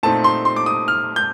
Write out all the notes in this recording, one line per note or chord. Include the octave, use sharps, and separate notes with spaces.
A#2 A3 C4 D#4 A5
C6
C6
D6
D#6
F6
G6